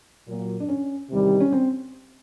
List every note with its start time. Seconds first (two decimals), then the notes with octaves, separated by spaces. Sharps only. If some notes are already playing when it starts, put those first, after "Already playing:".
0.27 A#2 F#3 A#3
0.60 D4
0.69 C#4
1.10 E2 C3 D#3 G3
1.40 C#4
1.52 C4